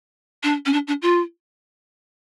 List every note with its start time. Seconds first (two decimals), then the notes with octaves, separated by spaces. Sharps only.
0.43 D4
0.66 C#4
0.73 D4
0.87 D4
1.02 F4